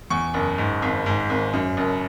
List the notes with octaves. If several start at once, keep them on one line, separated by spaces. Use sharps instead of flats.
E2 C#6
F#1
G#2
G#1
G#2
G#1
F#2
F#1